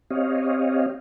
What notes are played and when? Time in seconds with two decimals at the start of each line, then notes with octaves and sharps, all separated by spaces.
0.10 C4 G4 C#5 D#5 F5